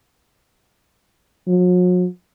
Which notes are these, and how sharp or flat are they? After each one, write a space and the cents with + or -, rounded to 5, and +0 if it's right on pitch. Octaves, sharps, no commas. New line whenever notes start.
F#3 -40